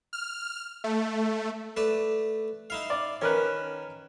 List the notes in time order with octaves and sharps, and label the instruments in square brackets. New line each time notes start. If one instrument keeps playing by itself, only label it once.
[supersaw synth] F6
A3
[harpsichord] A3 B4 D5
D#4 E4 F5
[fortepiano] D5
[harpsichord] D#3 [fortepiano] C#4 A#4 B4